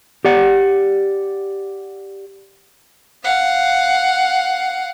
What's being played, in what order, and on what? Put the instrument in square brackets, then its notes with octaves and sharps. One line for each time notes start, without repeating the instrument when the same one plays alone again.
[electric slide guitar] G4 D5 F#5
[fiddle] F5 F#5